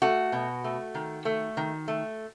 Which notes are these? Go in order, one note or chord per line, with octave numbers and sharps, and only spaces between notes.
A3 F#4
B2
A3
D#3
A3
D#3
A3